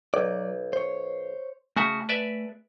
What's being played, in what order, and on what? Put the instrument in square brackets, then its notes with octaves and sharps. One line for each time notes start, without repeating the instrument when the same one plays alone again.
[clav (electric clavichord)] B1 [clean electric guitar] F#3 D5
[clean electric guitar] C5 C#5
[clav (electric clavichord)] C#3 F#4 E5 [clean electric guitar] A3 G#5 A5
[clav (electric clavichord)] B4 D5 E5